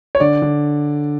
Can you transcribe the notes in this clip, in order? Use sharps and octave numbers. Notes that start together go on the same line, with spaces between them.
C#5
D3 D5
D3